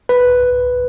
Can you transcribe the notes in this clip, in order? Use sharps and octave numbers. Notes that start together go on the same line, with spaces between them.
B4